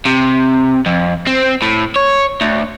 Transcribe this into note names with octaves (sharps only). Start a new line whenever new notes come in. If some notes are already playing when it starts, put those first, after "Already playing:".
C3
F2
C4
A2
C#5
D2